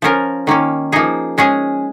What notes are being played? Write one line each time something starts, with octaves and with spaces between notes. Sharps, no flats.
F3 C#4 F4 A#4
D#3 A#3 C#4
F3 A#3 D#4 G#4
G#3 C#4 G#4